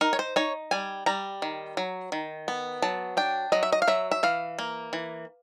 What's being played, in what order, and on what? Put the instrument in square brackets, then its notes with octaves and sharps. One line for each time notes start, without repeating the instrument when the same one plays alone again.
[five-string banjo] D#4 A#4
C#5
C5
D#4 C#5
G3 G#5
G3 A#5
D#3
F#3
D#3
B3
F#3 A5
D4 G5
F#3 D#5
E5
D#5
F5
F#3 E5
E5
E3 F5
A#3
E3